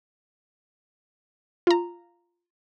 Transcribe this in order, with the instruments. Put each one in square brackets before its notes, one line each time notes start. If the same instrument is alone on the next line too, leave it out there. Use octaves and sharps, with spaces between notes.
[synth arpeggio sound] F4 A#5